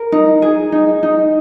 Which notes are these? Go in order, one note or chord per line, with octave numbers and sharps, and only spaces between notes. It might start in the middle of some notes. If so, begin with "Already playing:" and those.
Already playing: A#4
D#4
G#4
D#4
D#4